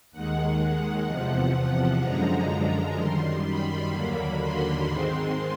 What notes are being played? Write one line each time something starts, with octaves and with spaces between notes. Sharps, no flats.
D#2 D#3 G#3 F#5
E2 C3 F3
F#2 D3 F3 G#3 A#5
A#5
F#2 D#3 G3 C6
B5
D#2 D3 F#3 A#3
C6
G#2 D#3 G#3 C4